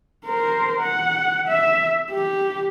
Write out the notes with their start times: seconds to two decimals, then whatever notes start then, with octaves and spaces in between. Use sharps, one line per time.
0.26 A#4 C5
0.80 F#5
1.48 E5
2.11 G4